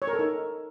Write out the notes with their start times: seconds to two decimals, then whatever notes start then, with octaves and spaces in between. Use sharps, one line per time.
0.02 C#5
0.07 A#4
0.13 A4
0.19 D#4